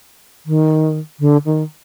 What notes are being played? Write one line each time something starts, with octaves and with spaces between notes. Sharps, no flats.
D#3
D3
D#3